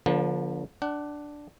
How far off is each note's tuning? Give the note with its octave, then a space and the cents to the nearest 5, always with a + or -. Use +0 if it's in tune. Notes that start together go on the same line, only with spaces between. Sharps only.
D3 -20 F3 +15 A#3 +45
D4 +0 F#5 +30